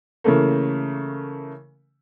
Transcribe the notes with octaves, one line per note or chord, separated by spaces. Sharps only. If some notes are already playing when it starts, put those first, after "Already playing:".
C#3 E3 A3 A#3